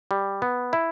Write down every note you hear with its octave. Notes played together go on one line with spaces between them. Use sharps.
G3
B3
E4